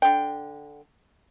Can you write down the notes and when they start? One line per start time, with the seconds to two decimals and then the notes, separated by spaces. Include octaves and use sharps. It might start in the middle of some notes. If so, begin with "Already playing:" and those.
0.02 D3 G5